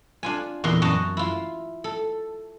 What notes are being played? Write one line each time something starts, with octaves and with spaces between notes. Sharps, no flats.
D4 F4 G#5
E2 A#2 A#5 C6
F#2 F#4 D#5 A5 A#5
E4 F4
A4